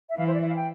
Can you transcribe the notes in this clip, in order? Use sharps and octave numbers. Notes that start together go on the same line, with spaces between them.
E5
E3 F5
C5
D5
E5
F5
G5